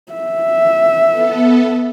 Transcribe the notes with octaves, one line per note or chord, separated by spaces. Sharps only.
E5
B3 A4